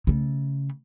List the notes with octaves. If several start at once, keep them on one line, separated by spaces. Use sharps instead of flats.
C#3 A3